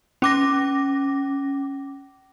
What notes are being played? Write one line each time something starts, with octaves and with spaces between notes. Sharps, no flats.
C#4 D6 A#6